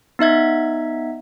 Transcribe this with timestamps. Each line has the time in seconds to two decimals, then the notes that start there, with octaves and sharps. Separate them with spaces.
0.19 B3 D#4 E5 G#6